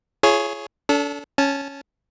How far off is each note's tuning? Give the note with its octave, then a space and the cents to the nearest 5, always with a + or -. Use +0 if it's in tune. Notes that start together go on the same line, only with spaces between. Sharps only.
F4 -40 G#4 +15 C#5 +0
D4 -40 A4 +0
C#4 +0 A5 -15